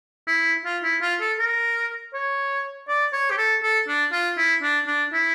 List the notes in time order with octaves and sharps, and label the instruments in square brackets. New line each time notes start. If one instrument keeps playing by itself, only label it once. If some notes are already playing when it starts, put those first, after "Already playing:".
[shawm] E4
F4
E4
F4
A4
A#4
C#5
D5
C#5
G4
A4
A4
D4
F4
E4
D4
D4
E4